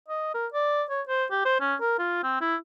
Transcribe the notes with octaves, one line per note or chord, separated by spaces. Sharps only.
D#5
A#4
D5
C#5
C5
G4
C5
C#4
A#4
F4
C4
E4